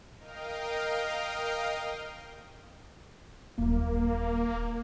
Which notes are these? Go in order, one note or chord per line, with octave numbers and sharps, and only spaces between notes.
A#4 D#5 F5 G5
D#1 F#3 A#3